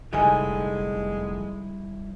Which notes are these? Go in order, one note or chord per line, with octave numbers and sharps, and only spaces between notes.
F1 D3 G3 G#3 D#4 E4 D#5 G#5